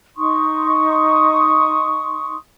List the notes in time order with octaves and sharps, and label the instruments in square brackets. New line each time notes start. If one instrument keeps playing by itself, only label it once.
[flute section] D#4 C6 C#6 D#6